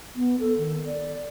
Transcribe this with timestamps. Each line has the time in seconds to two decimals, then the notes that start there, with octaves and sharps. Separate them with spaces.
0.16 B3
0.40 A4
0.58 D#3
0.86 D5